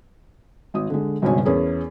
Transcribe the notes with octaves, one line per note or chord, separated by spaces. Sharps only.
G#1 D#6
D3 G#3
G#1 C#2 G2 B2 C#5 G#5
E2 C#4 G#4 A#4